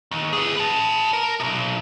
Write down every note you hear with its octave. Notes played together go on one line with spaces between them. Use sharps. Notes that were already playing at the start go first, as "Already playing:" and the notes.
D#2
G#4 B4
B4 A5
A#4
B1 C3